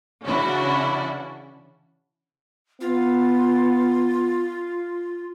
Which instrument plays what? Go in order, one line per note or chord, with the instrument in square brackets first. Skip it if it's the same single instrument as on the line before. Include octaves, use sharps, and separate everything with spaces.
[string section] C#3 E3 C#4 D4 E4 F#4
[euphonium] B3 [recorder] F4